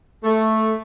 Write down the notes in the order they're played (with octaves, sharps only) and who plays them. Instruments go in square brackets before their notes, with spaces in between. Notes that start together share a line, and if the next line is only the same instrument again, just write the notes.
[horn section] A3